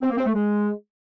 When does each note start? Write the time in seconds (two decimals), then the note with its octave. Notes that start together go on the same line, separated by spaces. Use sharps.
0.02 C4
0.10 A#3
0.17 C4
0.25 A3
0.33 G#3